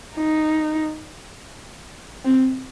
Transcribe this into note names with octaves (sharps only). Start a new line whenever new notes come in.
D#4
C4